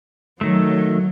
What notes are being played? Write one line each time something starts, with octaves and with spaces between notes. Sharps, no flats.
D#3 F#3 A3